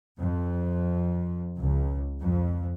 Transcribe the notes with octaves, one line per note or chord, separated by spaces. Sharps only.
F2
C#2
F2